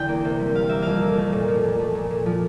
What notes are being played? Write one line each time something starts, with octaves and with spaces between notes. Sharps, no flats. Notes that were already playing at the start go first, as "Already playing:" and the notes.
Already playing: E2 D3 G5
A#3
C3
G3
G3 F5
A#3 E5
F2 F5
A#3
A3
A#2
F3
A#2
A3
A#2
A#2
F3